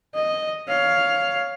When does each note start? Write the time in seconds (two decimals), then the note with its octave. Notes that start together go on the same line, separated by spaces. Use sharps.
0.15 D#5
0.68 C#5 F5